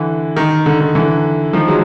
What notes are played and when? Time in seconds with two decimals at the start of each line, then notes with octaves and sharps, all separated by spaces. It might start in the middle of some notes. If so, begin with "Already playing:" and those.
Already playing: D3 E3
0.36 D#3
0.66 D3
0.80 D#3
0.95 D3 E3
1.53 D#3 F3
1.68 F#3 G#3